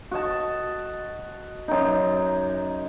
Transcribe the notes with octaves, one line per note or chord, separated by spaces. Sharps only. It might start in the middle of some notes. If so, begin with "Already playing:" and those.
F#4 D#5 A5
F#2 D#4